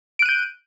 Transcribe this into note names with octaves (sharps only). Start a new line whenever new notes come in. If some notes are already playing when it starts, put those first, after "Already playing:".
F#6 G6 D7 D#7